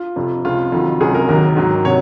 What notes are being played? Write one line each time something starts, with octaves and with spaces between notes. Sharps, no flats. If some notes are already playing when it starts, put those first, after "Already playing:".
Already playing: F4
F2 C3 F3
C#2 C3 F3 F4
F2 D#3 F#3
C#2 C3 F#3 G#4
A#4
D#2 D#3 F#3 A#4
G#2 D#3 F#3
C3 F#3 C#5